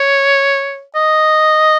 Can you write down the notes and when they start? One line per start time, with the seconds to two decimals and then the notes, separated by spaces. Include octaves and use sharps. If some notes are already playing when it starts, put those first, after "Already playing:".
Already playing: C#5
0.96 D#5